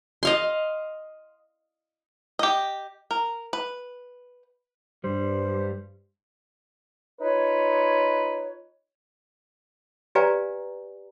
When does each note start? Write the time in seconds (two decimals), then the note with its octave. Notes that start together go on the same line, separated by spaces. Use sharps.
0.23 D#5 F5 C6
2.39 G4 D#5
3.11 A#4
3.53 B4
5.04 G2 G3 C5
7.20 D#4 F4 B4 C#5
10.15 G4 B4 D5 F5 G#5 A#5